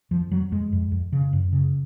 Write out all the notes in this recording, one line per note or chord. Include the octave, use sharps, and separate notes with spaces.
F2 F3
F2 F#3
F2 G#3
F2
F2
C#3
F#2
C#3